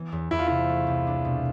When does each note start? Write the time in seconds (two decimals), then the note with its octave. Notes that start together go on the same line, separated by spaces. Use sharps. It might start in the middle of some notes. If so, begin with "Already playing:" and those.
Already playing: E3 B3
0.12 E2
0.31 E2 E4
0.39 F4
0.48 C3 E4
0.69 A3
0.87 C2
1.07 D4
1.25 B2